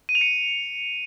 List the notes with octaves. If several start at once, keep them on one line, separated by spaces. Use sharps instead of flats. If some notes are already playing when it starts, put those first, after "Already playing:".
D#7
F7
C#7